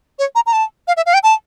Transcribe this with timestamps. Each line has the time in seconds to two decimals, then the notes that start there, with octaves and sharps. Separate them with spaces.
0.19 C#5
0.35 A#5
0.46 A#5
0.53 A5
0.88 F5
0.97 E5
1.06 F5
1.14 G5
1.23 A5